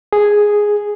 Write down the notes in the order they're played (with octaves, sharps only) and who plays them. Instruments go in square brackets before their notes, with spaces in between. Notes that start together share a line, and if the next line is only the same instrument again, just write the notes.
[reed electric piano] G#4